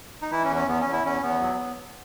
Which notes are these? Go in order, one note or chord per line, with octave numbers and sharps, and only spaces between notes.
D#4
E3 E4
C#4
E2
C#4
E2 B3
E2 C#4
E4
E2 C#4
E2 B3
F#3